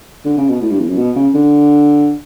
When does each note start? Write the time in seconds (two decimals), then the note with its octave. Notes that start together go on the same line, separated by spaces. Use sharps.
0.25 D3
0.38 C#3
0.50 B2
0.62 A2
0.71 G2
0.80 E2
0.89 F#2
0.98 B2
1.16 C#3
1.35 D3